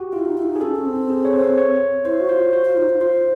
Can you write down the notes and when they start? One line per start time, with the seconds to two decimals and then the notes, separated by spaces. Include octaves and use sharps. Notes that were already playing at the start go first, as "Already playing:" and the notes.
Already playing: F#4 G4
0.13 E4 F4
0.25 D#4
0.38 E4
0.49 D#4
0.56 G#4
0.61 C#4 A4
0.75 C#4
0.85 C4
1.10 G#4
1.25 C#5
1.33 C5
1.58 C#5
2.05 E4 C5
2.20 F#4
2.29 F4 C5
2.53 F#4 C5
2.65 F4
2.77 D#4
2.89 F4
3.01 F4 C5